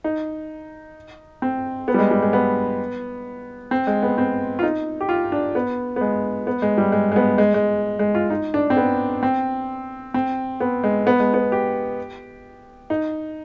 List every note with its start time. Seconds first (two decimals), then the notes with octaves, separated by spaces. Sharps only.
0.04 D#4
1.42 C4
1.88 B3
1.94 G3
1.99 G#3
2.11 G3
2.22 G#3
2.33 B3
3.71 C4
3.87 G#3
4.03 B3
4.18 C4
4.59 F4
4.63 D#4
5.01 G4
5.09 F4
5.32 D4
5.55 B3
5.96 B3
6.01 G#3
6.47 B3
6.62 G#3
6.78 G3
6.92 G#3
7.12 G#3
7.16 B3
7.38 G#3
7.54 G#3
7.99 G#3
8.15 F4
8.30 D#4
8.54 D4
8.70 C4
8.77 B3
9.23 C4
10.14 C4
10.60 B3
10.84 G#3
11.07 B3
11.20 G#3
11.34 B3
11.52 G4
12.90 D#4